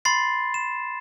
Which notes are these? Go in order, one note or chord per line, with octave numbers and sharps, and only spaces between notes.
B5 C6 A6 C7
E7